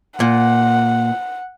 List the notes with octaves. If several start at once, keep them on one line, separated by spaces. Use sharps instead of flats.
A#2 F#5